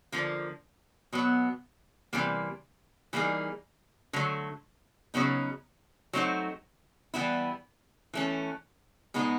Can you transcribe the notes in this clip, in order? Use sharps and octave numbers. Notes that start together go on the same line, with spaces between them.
D3 F3 A#3
B2 F#3 B3
C3 E3 G3 A#3
E3 G3 A#3 D#4 G#4
D3 F#3 A3
C#3 F#3 B3 D#4
F#3 A3 C4 D#4 F#4
E3 G3 B3 E4
E3 A3 C#4
B2 G#3 B3 D#4